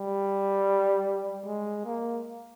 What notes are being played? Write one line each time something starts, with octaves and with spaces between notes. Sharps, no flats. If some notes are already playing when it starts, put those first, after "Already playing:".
Already playing: G3
G#3
A#3